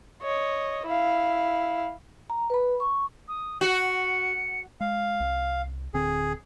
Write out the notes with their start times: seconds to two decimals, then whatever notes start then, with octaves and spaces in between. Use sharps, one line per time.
0.22 C#5 D#5
0.86 E4 F5
2.30 A#5
2.50 B4 B5
2.80 C#6
3.28 D#6
3.61 F#4 C#7
4.80 G#3 F5
5.20 C2
5.94 D1 D3 C4 G#4